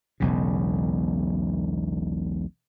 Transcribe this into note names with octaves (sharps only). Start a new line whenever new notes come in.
E1 B1 C#3